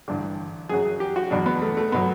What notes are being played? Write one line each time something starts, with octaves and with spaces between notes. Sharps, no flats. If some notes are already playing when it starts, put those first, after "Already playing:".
A1 G2 D3
F#2 C#3 F#3 G#4
G4
F#4
E2 B2 F#3 D4
B3
A3
A3
B2 F#3 B3